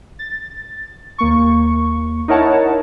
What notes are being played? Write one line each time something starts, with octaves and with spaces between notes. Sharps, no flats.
A6
D#2 A#3 C#6
D#4 E4 A#4 C#5 F#5 A5